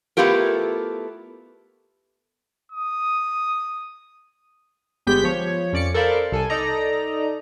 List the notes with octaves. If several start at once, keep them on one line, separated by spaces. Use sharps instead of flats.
A3 B3 E4 F4 G4 A#4
D#6
G1 G#3 B3 G4 G6 B6
F3 C#5
F2 C#4 D5 D6 C#7
A4 A#4 C5 D5 F5 B5
C2 A4 G#5
D#4 A4 D5 D#5 A#5